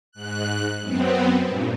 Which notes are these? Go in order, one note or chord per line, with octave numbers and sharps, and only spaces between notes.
G#2 F#6
F#2 B3 C4
G2 A#2